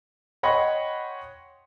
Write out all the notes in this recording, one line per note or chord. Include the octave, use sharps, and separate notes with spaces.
C#5 D#5 F#5 G5 B5 C6